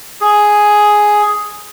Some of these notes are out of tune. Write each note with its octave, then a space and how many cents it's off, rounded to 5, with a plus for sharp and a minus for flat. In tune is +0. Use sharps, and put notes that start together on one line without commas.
G#4 +5